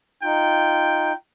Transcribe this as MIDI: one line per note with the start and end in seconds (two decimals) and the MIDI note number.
0.23 1.12 63
0.23 1.14 65
0.23 1.14 79